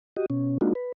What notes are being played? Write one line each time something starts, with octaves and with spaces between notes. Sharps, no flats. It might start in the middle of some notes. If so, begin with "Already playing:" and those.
F#4 G4 D#5
B2 C#4
G#3 A#3 D4 D#4 F4 F#4
B4